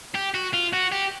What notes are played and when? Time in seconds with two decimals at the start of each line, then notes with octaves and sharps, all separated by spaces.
0.15 G4
0.34 F#4
0.53 F4
0.73 F#4
0.92 G4